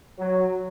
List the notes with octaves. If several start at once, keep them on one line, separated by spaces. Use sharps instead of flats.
F#3